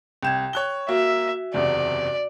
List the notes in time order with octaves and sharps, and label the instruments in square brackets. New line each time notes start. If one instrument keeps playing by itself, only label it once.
[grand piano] C2 E7 [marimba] G5 G6 G#6
[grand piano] C#5 F#6 G7
[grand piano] A#3 [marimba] F#4 [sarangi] E5
[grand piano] F#1 E2 C3 [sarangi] D5